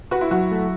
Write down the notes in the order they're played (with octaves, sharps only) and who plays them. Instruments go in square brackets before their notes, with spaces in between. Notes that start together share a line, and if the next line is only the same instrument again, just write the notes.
[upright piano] F#4 [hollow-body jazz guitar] B4
[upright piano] E4
[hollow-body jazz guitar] F#3 [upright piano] F#4
[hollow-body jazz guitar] A3